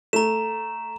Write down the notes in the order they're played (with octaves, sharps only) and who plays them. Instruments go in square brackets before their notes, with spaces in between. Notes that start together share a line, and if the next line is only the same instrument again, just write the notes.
[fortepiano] A3 [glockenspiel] A#5 E7